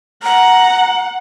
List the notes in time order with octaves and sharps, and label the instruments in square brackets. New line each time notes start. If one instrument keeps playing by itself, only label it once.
[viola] F#5 [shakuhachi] A#5